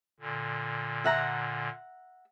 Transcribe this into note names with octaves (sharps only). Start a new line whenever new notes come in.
A#2 D3
E5 F#5 A#5